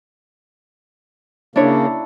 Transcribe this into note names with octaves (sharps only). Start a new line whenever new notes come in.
C#3 A#3 D4 E4 C#5